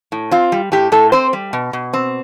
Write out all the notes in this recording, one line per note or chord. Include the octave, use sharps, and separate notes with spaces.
A2
C4 F4
G3
A2 G4
A2 A4
C4 C5
G3
B2
B2
C4